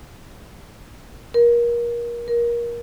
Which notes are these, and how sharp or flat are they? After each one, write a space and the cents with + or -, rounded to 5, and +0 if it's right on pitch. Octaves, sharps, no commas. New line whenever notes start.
A#4 +25
A#4 +20